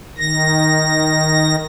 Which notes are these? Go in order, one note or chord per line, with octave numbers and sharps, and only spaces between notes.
D#3 A#6